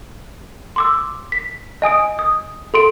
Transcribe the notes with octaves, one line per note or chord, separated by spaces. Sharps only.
C6 D6 E6
B6
D#5 G#5 D#6 D7
D#6
A4 C6 D7